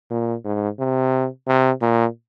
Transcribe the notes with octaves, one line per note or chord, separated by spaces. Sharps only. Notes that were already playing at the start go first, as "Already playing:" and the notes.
A#2
G#2
C3
C3
A#2